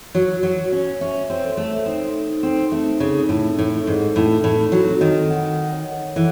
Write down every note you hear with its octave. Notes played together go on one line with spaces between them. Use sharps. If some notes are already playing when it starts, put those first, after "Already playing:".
F#3 C#5
F#3
C#5
C#4
C#4 E5
C4
A4
A3
C4 D#4
D#4
C4
A3 C4
C#3
D#4
A2
A2 A4
G#2
A4
A2
A2 A4
F#3
C4
D#3
F#5
C#5
E3 A4